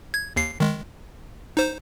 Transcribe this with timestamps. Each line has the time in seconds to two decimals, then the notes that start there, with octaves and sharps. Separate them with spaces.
0.14 G#6
0.36 D#2 C7
0.60 D#3 G#3
1.57 D#4 C5